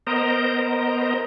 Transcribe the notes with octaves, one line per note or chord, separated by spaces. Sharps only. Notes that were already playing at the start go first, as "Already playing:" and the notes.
B3 A#4 C5 D#5 A#5